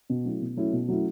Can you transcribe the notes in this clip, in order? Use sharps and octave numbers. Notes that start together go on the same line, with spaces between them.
B2
F#3 A3 C#4 E4
B2
F#3 A3 C#4 E4
B2
F#3 A3 C#4 E4